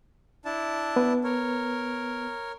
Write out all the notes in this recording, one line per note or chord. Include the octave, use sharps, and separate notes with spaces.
D4 E4 A5
B3 B4
A#4 C#5